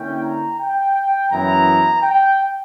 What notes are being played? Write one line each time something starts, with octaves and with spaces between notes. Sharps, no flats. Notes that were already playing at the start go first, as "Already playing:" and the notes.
Already playing: D3 A#3 C#4 E4 G5
A#5
G5
F#2 E3 B3 E4 A#5
G5